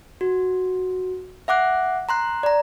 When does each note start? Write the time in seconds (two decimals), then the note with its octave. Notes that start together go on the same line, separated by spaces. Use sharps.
0.21 F#4
1.48 E5 F#5 D6 F#6
2.09 A#5 C6 F#6
2.43 D5 A#5